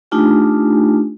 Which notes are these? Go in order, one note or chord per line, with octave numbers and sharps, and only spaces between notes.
A3 D4 D#4 F4 G4 G#5